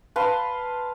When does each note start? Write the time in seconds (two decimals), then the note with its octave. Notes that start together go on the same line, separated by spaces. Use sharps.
0.16 B4 F5 A5 C6